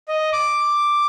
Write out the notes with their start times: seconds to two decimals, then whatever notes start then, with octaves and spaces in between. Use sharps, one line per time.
0.08 D#5
0.33 D6